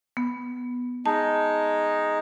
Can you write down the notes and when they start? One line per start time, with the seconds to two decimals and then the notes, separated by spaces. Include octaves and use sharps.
0.17 B3
1.06 G#3 D#4 A5